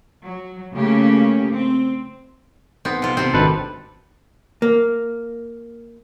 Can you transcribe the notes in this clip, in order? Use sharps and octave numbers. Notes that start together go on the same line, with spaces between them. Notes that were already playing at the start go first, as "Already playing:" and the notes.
F#3
C#3 A3 A#3 C#4 G4
C4
B1 B3 C4
C3 F4
B1 C3 C4
G#1 D2 D#3 A4 B4
A#3